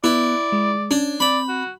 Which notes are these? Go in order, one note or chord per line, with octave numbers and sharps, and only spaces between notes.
B3 E4 D5
G#3
C#4 D4
C4 D5 B5
F#4